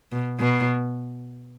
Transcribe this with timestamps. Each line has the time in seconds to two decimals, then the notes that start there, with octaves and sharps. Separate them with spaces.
0.12 B2
0.39 B2